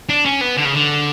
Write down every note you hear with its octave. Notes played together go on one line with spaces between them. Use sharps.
D4
C#4
B3
D3
C#3
D3